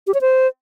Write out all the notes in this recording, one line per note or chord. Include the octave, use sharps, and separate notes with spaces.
G4
C#5
C5